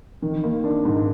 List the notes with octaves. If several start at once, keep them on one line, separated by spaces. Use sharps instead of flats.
D#3
A#3
D4
G#2